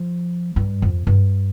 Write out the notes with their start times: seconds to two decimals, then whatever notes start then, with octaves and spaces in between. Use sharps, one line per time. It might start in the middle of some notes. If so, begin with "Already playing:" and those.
Already playing: F3
0.56 G2
0.82 F2
1.07 G2